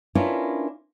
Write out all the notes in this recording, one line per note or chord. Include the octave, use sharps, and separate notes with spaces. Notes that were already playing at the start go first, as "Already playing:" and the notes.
C#4 D4 E4 F4 A#4 B4